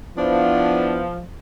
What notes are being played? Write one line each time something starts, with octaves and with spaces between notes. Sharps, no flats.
F3 B3 D4 E4